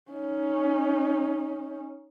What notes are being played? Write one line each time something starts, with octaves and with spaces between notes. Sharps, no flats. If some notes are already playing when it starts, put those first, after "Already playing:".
C#4 D#4